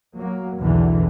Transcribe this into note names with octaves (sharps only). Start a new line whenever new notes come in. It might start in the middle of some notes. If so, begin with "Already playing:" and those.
F#3 A#3
B1 E2 D3 E3